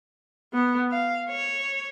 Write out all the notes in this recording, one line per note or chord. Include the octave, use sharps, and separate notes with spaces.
B3
F5
C#5